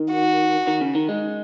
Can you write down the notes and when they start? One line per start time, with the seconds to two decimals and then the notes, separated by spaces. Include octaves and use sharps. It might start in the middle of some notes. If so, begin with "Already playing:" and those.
Already playing: D#3
0.12 F#4
0.67 D#3
0.81 C#3
0.95 D#3
1.08 G#3